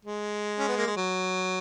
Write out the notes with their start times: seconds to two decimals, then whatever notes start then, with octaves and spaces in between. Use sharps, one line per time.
0.05 G#3
0.59 C#4
0.68 B3
0.77 A#3
0.87 G#3
0.97 F#3